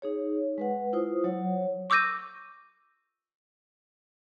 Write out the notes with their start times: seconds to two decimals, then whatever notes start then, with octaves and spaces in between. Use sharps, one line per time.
0.02 D#4 G#4 C#5
0.58 G#3 B4 F#5
0.93 E4 F4 C5 D#6
1.24 F#3 C#5 F#5
1.90 C#6 D6 E6 G6 A#6 D#7